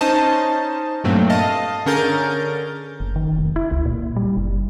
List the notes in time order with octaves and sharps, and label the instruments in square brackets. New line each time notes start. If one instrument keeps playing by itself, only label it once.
[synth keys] C#4 D#4 C5 D#5 A5
G2 A#2 F#3 A3 C4
D#5 F5 A5
D3 C#4 G#4 A#4 G6 A6
[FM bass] F#1
D#3
F1
E4
C#2
A#2
G3
F#1